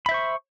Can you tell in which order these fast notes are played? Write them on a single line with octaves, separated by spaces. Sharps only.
B5 E5 C5 C#6